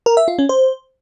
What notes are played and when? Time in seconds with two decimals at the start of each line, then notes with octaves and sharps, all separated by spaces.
0.06 A#4
0.17 E5
0.28 F4
0.39 C#4
0.49 C5